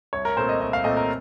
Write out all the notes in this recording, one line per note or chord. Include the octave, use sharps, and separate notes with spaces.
C2 C#5
A#4
A#2 A3 C4 C5
D#5
C2 D#5
F5
A#2 A3 C4 D#5
A#4